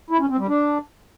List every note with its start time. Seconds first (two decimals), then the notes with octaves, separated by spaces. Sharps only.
0.11 E4
0.20 C#4
0.29 C4
0.39 G3
0.48 D4